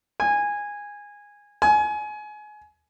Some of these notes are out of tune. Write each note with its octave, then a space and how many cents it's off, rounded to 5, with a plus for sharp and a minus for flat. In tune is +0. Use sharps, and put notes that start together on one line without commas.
G#5 -15
G#5 +25